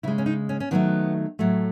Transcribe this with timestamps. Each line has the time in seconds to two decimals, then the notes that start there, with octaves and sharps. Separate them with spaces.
0.03 C#3 G#3 E4
0.18 C#4
0.26 D#4
0.49 C#4
0.60 C#4
0.71 D#3 F#3 A3 B3
1.39 A2 F#3 A3